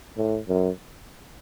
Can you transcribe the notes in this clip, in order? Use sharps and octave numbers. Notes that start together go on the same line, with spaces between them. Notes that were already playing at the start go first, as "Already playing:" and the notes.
A2
F#2